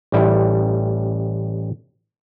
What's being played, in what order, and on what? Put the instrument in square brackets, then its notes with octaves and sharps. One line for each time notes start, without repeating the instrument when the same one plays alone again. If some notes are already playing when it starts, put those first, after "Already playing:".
[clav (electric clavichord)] A1 G3 E4